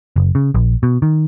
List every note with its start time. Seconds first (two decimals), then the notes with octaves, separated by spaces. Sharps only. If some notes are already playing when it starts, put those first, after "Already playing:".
0.16 F#1
0.35 C#3
0.54 A#1
0.83 B2
1.02 D#3